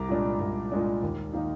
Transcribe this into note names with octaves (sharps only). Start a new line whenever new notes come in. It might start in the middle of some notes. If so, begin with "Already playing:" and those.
Already playing: C2 A#5 D6
A#2 G#3 D4
C2
A#2 G#3 D4
D#2
D#3 A#3 D#4